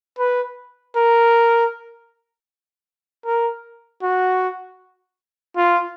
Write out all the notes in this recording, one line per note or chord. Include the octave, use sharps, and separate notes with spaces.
B4
A#4
A#4
F#4
F4